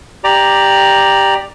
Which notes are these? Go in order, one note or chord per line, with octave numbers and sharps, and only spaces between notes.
G4 D5 A#5